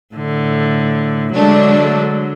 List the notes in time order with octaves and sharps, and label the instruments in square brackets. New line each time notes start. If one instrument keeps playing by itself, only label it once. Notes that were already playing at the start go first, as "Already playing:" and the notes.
[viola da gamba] A2 D3
[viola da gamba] D3 F#3 [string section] G#3 A3 D4